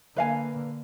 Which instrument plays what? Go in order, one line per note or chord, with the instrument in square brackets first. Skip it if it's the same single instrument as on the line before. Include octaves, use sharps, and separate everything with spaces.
[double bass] D3 A#3 [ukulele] B4 F5 G#5